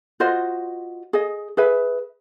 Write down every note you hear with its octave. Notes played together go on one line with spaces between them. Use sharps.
F4 F#4 C5 D#5
G#4 D#5
G#4 B4 E5